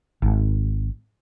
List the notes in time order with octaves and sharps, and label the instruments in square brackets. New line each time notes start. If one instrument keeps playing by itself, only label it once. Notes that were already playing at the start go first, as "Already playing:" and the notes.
[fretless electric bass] G#1